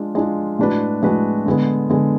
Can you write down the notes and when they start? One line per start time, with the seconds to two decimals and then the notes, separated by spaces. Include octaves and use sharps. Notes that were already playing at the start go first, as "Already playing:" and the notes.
Already playing: G#3 D4 F4
0.15 G#3 D4 F4
0.59 A2 G#3 D4 F#4 B4
1.03 A2 G#3 D4 F#4 B4
1.46 D3 G#3 B3
1.90 D3 G#3 B3